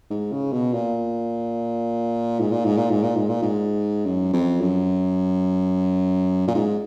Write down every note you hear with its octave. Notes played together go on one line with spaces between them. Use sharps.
G#2
C#3
B2
A#2
G#2
A#2
G#2
A#2
G#2
A#2
G#2
A#2
G#2
F#2
F2
F#2
A#2
G#2